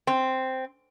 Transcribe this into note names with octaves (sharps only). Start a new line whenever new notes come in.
C4